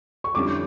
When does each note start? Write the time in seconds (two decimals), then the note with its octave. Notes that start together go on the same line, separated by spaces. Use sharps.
0.24 C#6
0.34 F2 D3 G3 C#4 E4 D6